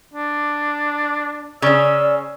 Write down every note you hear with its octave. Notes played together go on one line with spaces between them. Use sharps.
D4
C#3 C#4 D5 E6